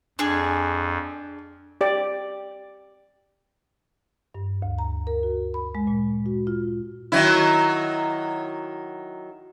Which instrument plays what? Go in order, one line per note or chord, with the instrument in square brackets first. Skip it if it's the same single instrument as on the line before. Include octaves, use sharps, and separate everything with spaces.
[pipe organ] F2 [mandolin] D4 G#4
[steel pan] G4 D5
[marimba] G2
D2
A#5
A#4
F#4
B5
G#3
A#2
F#4
F4
[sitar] D#3 F#3 E4